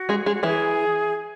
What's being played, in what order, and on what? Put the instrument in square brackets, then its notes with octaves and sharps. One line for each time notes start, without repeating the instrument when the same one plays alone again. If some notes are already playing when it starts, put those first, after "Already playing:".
Already playing: [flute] F#4
[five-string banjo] G#3 G#4
G#3 G#4
[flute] F#4
[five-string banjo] E3 E4 [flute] G#4